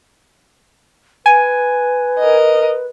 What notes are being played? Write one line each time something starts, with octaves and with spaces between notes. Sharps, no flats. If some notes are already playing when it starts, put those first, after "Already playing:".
B4 G#5
A#4 D#5